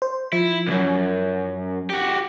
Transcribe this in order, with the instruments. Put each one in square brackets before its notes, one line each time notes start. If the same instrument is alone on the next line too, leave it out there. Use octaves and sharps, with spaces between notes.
[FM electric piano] C5
[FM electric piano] F3 [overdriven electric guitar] E4
[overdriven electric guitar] C2 F#2
F#4 G4